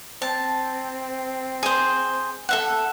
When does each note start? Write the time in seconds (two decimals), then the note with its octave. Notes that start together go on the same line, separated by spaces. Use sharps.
0.22 C4 A5
1.63 G#4 C5
2.49 A4 E5 F#5